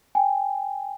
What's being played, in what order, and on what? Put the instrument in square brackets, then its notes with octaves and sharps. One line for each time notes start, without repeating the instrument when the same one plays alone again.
[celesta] G5 G#5